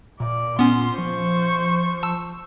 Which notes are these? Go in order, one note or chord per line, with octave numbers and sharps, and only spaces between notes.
A#2 D5
B3 C#4 C6
F3 C5 C#6
A5 E6